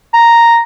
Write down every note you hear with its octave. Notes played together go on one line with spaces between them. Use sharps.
A#5